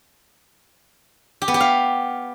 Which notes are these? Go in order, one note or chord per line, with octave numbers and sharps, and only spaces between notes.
G4
B3
G4
F5